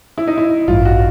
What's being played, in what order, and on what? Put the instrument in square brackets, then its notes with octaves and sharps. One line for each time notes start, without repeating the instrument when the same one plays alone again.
[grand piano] E4
D#4
E4
[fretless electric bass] A1 G2 E3 [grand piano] F4
[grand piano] F#4